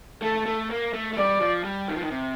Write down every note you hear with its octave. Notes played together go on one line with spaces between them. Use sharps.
A3 A4
A3
A#3
A3
A3
G3 D5
F3
G3
D#3
F3
D#3
C3